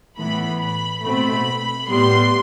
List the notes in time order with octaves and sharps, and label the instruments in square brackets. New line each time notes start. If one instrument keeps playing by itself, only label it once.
[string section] A2 E3 B3 B5
B5
B2 A3 C4 B5
A2 G3 B3 C6